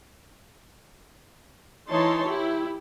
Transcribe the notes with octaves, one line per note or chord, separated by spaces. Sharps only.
E3 D#4 E4 C#5 A5 C6
E4 G4